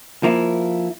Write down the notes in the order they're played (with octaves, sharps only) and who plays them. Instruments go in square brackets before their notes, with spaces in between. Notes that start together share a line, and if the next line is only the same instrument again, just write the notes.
[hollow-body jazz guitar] F3 A#3 E4